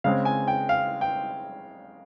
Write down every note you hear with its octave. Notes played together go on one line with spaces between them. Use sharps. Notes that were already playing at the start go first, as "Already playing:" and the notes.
C#3 G#3 C4 F5
G#5
G5
F5
G5